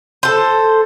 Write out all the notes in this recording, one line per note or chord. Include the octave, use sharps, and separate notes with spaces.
A4 C5